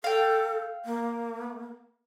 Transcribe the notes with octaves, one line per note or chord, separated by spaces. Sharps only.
A4 F5 G5
A#3